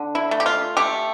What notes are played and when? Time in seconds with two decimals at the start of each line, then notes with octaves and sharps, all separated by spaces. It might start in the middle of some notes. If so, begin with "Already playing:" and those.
Already playing: D3
0.15 E4
0.31 A3
0.40 G4
0.46 F4
0.77 A3 G4